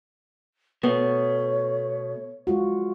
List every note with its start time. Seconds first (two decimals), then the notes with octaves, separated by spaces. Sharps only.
0.83 B2 A3 B3 C#5
2.47 G#3 F4 F#4